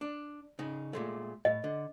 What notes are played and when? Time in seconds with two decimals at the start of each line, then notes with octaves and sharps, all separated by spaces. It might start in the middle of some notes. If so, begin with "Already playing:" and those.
0.01 D4
0.59 C#3 D#4
0.93 A#2 G#3 A3
1.45 A2 D#5
1.64 D3